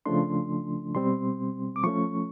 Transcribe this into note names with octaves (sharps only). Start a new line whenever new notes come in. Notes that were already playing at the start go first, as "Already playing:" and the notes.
C#3 F3 A3 D4 C6
B2 G3 C4 C6
D6
F3 A3 C#4 C#6